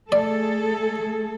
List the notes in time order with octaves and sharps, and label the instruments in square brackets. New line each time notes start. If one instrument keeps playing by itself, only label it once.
[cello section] A3 G#4 A4 [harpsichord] D5